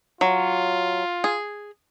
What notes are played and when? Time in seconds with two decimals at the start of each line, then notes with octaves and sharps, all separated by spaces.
0.21 F#3 F4
1.24 G#4